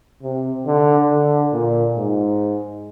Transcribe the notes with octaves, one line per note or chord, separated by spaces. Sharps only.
C3
D3
D3
A#2
G#2